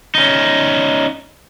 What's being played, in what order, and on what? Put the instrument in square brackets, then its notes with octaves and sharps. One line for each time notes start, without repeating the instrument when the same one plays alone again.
[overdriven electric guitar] C#4 D#4